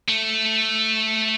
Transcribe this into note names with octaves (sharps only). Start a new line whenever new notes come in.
A3